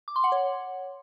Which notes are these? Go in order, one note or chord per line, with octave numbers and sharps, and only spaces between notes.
D6
C6
F#5
C#5